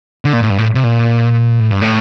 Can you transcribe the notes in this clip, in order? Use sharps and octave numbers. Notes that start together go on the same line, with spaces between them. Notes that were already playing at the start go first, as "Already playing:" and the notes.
D3
A#2
A2
G2
A2
C3
A#2
A2
G2
A2